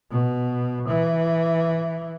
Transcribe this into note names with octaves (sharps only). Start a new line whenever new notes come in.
B2
E3